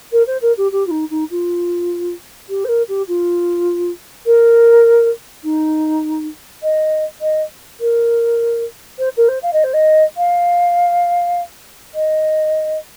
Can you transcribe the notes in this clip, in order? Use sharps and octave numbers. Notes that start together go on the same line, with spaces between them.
A#4
C5
A#4
G4
G4
F4
D#4
D#4
F4
G4
C5
A#4
G4
F4
A#4
D#4
D#5
D#5
A#4
C5
A#4
C5
F5
D#5
C5
D#5
F5
D#5